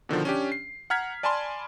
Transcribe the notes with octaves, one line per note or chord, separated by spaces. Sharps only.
B2 D3 D#3 F3
C#4 D4 G4
C7
F#5 A#5 F6 G#6 B6
D5 G#5 A5 B5 C6